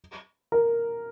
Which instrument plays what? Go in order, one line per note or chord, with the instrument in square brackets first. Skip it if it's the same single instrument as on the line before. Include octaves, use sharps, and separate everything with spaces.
[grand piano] A#4